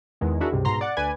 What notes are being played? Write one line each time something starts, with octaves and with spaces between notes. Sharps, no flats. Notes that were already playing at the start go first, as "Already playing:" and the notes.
E2 D#3 G#3
D4 E4 F#4 G#4 A#4
C#2 G2 C3
G#2 B2 A#5 C6
D5 F#5
D2 B4 D5 G#5